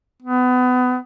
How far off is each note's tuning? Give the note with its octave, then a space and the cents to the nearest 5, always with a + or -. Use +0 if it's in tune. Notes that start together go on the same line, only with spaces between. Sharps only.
B3 +25